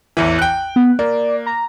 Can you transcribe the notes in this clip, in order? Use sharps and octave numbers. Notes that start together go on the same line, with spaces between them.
A1 E2 E3
G5 F#6
B3
A#3 D5
A#5